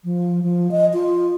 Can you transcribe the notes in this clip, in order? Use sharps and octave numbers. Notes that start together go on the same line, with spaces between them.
F3
F3
D#5
F4